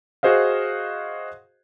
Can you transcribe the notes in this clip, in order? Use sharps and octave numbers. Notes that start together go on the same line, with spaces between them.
F#4 G#4 C5 D#5 F5